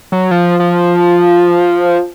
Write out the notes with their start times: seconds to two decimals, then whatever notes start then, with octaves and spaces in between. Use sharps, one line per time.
0.12 F#3
0.31 F3
0.60 F3